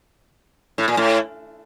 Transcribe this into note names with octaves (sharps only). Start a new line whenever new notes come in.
A2
A#2
A2